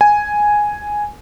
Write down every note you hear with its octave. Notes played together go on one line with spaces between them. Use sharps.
G#5